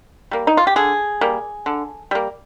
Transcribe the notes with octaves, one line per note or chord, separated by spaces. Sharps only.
G3 A#3
D#4
F4
G4
D3 G#4
G3 A#3
D3
G3 A#3